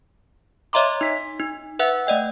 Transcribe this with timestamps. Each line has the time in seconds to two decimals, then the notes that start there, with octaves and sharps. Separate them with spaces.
0.73 C#5 D#5 E5 A#5 C6 D6
1.01 D#4 B6
1.40 D#4
1.79 B4 E5 F#5 F#6
2.07 A3 D5 D#5 G5